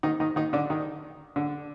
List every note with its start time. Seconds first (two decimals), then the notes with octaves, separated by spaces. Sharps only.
0.03 D#3 D#4
0.20 D#3 D#4
0.36 D#3 D#4
0.53 D3 D4
0.70 D#3 D#4
1.36 D3 D4